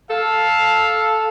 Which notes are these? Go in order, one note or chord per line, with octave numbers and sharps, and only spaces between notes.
A4 F5